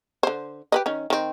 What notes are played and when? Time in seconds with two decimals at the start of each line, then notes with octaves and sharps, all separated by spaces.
0.23 D3 C5
0.72 G4 B4 D#5
0.86 D#3 C#4
1.10 D#3 C4